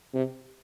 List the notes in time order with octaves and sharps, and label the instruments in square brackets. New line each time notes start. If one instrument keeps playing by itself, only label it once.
[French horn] C3